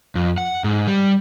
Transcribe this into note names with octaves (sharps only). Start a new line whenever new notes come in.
F2
F#5
G#2
G3